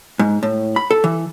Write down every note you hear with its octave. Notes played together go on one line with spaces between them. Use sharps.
G#2
A2
B5
A4
E3